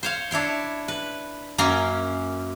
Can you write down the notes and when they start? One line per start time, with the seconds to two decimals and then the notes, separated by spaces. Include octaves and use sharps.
0.03 C5 C#5 F5
0.31 D4 E4 C#5 C6
0.88 B4
1.58 F#2 A#3 C#4 A#4 A#5 C6